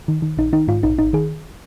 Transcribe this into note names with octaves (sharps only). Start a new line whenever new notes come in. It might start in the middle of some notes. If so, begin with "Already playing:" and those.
D#3
D#3
A#1 D#4
D#3 D#4
G#2 F4
A#1 D#4
G#1 D#4
D#3 G#4